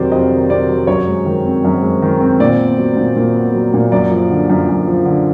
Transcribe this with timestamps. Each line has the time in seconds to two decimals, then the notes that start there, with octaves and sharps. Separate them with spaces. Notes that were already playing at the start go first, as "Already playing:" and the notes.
Already playing: F2 C3 D#3 F#3 C5 D5
0.12 F2 D#5
0.30 D#3
0.50 C3 D5
0.68 F#3
0.87 F#2 C#5
1.07 G#3
1.26 D#3
1.45 C4
1.64 F#2
1.82 G#3
2.02 D#3
2.20 C4
2.40 A#2 D5
2.59 B3
2.78 F#3
2.97 A#2
3.16 A#2
3.35 B3
3.54 F#3
3.74 A#2
3.92 F#2 D5
4.11 F3
4.30 D3
4.50 F#2
4.68 F#2
4.87 F3
5.06 D3